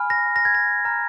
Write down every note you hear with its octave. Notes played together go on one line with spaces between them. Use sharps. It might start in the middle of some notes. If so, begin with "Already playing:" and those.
Already playing: G#5 B5 F6
A#6
A#6
G#6
A#6
A#5 F6